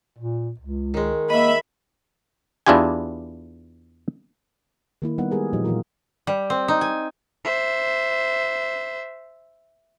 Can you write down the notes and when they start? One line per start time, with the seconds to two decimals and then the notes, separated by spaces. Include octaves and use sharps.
0.18 A#2
0.59 C#2
0.94 D#3 G#3
1.30 A#3 D#5 E5 B5
2.66 E2 D4 E4 F4 G4 G#5
5.02 D#3 A#3 E4
5.18 G3 B3 D#4 B4 F#5
5.31 G3 G#3 G4 G#4 A#4 B4
5.53 A#2 F3 F#3 D#4 G4
5.64 A#2 E3 F#3 F4 A#4
6.27 G3
6.50 C4
6.68 D#4
6.81 G#5
7.44 C5 E5